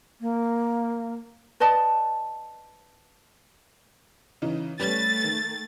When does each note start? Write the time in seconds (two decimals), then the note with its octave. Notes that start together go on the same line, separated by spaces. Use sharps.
0.21 A#3
1.60 B4 D5 D#5 A5
4.42 C#3 E3 D#4
4.80 G3 A3 C#4 B4 A6
5.24 D#3